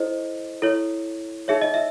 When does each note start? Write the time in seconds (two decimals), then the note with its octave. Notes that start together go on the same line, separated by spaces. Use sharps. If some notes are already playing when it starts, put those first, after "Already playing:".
Already playing: E4 A4 C5 D#5
0.62 E4 A4 C#5
1.48 D#4 G#4 C#5 E5
1.62 D#5
1.74 E5